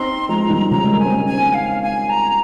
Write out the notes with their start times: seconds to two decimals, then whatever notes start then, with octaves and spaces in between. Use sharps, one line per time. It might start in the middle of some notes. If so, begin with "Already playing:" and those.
Already playing: C4 D#4 C6
0.29 F3 G#3 A#5
0.45 F3
0.50 D#3 G3
0.71 C#3 F3 A#5
0.84 G#3
0.92 G3 A#3
0.99 G#5
1.05 C4
1.12 A#3 C#4
1.26 G#5
1.33 G#3 C4
1.54 F5
1.82 G#5
2.09 A#5